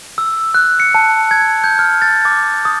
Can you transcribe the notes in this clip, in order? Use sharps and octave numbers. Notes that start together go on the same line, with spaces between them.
E6
F#6
C#7
A5
G#6
G6
F6
A6
D6
D#6